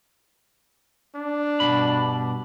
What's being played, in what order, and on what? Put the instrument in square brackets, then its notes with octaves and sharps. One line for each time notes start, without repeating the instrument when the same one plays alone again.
[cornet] D4
[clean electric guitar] G2 B2 B5